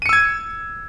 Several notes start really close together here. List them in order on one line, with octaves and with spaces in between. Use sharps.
D#7 C#7 E6 G#6